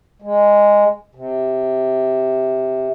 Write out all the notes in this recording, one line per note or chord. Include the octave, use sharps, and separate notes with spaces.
G#3
C3